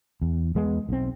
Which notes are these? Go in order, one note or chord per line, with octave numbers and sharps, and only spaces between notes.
E2
E2 G#3 B3
B1 C4